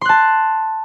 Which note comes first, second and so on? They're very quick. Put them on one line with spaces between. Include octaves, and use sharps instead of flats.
C6 F#6 A5